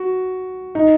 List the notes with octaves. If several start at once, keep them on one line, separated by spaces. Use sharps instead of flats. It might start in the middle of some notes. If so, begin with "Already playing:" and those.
Already playing: F#4
D#4